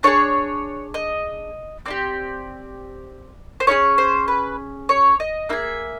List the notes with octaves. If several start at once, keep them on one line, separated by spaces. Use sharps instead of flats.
D4 F4 G#4 C#5
D#5
C4 D#4 G4 D5
C5
C#4 E4 G#4 C#5
C5
B4
C#5
D#5
A#3 D#4 G#4 E5